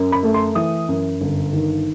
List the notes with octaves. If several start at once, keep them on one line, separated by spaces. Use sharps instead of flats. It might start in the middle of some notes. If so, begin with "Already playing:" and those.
Already playing: F#2
B5
A3
C6
E3 D#6
F#2
G1
D#3